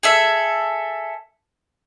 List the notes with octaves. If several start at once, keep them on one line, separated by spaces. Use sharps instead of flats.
G#4 A4 E5